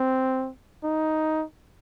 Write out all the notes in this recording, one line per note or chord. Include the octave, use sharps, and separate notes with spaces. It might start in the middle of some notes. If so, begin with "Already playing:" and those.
Already playing: C4
D#4